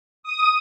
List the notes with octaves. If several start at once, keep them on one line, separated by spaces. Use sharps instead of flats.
D#6